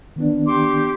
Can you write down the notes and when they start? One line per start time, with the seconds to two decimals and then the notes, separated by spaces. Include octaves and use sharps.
0.16 D#3 B3 D4
0.46 G4 C6 D6